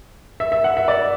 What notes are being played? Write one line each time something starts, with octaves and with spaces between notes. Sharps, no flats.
E5
E5
F#5
E5
D5